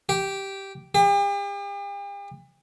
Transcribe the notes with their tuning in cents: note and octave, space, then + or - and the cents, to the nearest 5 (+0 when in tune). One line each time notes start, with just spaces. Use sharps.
G4 -5
G4 +45